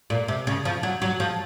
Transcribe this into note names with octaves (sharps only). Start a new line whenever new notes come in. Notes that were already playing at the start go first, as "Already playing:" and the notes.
A#2
C3
C#3
F3
F#3
F#3
F3